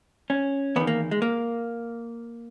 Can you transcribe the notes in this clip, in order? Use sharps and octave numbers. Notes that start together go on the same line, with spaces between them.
C#4
E2 D#3 B3
A#3
G#3
A#3